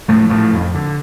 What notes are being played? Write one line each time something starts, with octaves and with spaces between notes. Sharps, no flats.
A2 F3 A3
A2 F3 A3
F2
D3